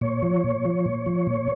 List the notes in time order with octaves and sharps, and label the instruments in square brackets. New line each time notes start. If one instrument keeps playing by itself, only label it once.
[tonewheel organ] A#2 C#5
F3
A#2
F3
A#2
F3
A#2